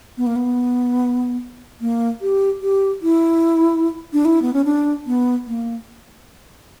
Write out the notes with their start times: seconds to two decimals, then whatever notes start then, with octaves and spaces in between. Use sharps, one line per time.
0.17 B3
0.27 A#3
0.36 B3
1.81 A#3
2.22 G4
2.62 G4
3.02 E4
4.13 D4
4.25 E4
4.42 B3
4.53 C#4
4.65 D4
5.06 B3
5.47 A#3